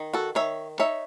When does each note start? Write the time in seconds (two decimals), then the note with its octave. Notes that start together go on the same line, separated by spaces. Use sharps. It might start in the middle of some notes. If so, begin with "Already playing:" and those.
Already playing: D#3
0.13 F#4 A4
0.35 D#3 C#5 E5
0.79 D#4 C#5 E5